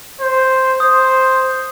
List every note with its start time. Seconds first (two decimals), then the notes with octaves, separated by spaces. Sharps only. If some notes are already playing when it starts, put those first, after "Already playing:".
0.21 C5
0.80 C5 D#6